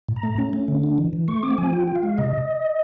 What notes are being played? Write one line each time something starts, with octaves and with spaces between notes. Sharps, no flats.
A2
A#5
A3
C#4
A3
D3
D4
E3
E3
A3 C#6
C4 D6
F3 G#5
F4 G5
F4
F5
G#3
C3 D#5